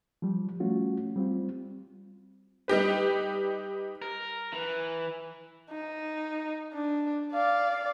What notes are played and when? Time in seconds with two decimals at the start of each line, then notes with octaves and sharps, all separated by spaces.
0.22 F3 G3
0.60 G3 A3 C#4 F4 F#4
1.16 G3 C4 F4
2.68 G3 D#4 G4 B4
4.02 A#4
4.53 E3
5.70 D#4
6.73 D4
7.32 D5 F5